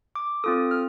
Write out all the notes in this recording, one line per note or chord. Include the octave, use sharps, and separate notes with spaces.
D6
C4 F4 A4 D#6
F6